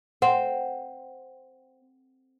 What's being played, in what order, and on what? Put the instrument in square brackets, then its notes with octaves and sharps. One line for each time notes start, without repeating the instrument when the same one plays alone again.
[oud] C4 [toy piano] F#5